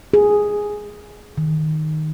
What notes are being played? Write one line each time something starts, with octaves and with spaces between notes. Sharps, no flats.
G#4
D#3